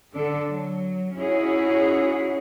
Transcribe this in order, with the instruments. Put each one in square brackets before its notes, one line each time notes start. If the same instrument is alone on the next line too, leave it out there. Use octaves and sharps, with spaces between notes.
[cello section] D3 D4 A4
F#3
C#4 D#4 E4 F#4 G#4 C#5